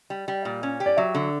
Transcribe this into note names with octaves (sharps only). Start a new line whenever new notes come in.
G3
G3
A#2
C#4
G4
D5
F#3 E5
D3